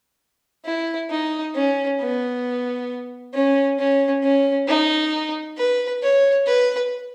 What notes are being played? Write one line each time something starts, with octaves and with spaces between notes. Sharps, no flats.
E4
D#4
C#4
B3
C#4
C#4
C#4
D#4
B4
C#5
B4